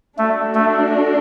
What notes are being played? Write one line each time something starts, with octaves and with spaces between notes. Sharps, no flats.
A3 D4 F#4 A4
A3